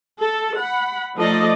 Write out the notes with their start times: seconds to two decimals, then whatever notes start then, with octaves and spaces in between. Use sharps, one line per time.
0.21 A4
0.58 F#5 B5
1.17 F3 A3 D#4 A4 D5 D#5